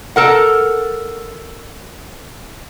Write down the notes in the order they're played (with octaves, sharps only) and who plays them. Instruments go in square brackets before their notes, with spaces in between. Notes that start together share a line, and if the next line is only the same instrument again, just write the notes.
[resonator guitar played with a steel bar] A4 A#4 F#5